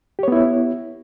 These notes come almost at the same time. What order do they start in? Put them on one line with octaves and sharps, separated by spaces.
G4 C#5 B3 E4